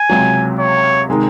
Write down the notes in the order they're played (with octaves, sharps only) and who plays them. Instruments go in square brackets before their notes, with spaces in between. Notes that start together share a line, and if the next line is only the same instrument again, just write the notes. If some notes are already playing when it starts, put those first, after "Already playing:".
Already playing: [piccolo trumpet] G#5
[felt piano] C#2 C3 F#3
[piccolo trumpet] C#5
[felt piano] C3 D#3 G#3 D#4